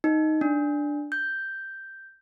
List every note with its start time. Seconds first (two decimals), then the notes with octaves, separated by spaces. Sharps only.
0.04 D#4
0.41 D4
1.12 G6